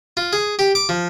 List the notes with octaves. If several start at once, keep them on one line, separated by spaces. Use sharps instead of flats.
F4
G#4
G4
D6
F3